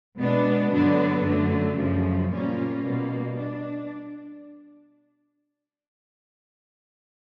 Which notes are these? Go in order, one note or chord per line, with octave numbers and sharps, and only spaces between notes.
B2 G#3 B3 D4
G2 D3 F#3 B3 D4
F#2 D3 F#3 A3
F#2 C#3 F3
A#2 G3 A#3 C#4 F4
B2 G3 A#3
D4